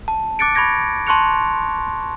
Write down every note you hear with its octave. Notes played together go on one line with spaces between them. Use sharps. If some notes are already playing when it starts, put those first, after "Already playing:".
A5
D6 F#6 A6 C#7 D7
B5 C#6 G#6 A#6
A5 C6 C#6 F#6 C#7 F7